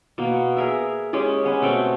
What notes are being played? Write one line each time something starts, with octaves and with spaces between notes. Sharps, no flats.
B2 A#3
G#4 A#4 E5
G#3 C#4 G4 G#4
B3 C#4 B4
B2 A3 C4 G5